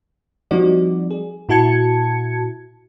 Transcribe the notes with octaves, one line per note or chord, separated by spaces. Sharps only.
F3 G3 C4 D#4 F#4 D5
G#4
A#2 E4 F#4 A5 G#6 C#7